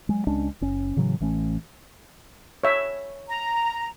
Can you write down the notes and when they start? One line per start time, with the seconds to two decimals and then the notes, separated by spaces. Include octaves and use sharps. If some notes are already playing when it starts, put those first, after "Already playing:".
0.09 F#3 G#3
0.27 C#2 G#3 C#4 D4
0.61 F#1 C#4
0.97 A2 C#3 E3 F#3
1.20 A1 E3 A3 C#4
2.64 C#5 E5
3.28 A#5